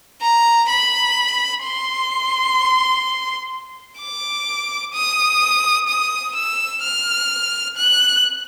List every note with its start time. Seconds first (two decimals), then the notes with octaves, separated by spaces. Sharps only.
0.22 A#5
0.69 B5
1.64 C6
3.99 D6
4.94 D#6
5.88 D#6
6.35 E6
6.83 F6
7.77 F#6